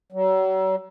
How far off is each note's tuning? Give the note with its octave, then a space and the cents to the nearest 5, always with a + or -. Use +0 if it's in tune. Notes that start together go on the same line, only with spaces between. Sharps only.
F#3 +40